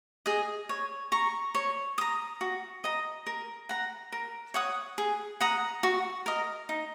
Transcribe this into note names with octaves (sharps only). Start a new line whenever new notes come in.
G#4 D#5
C#5
A#5 C#6
C#5
A#5 D#6
F#4
D#5 A#5
A#4
F#5 A#5
A#4
C#5 F#5 D#6
G#4
F#5 A#5 D#6
F#4
A#4 D#5
D#4